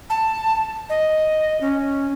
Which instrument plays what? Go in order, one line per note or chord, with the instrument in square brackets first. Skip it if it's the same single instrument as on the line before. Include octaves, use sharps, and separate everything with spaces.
[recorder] A5
D#5
C#4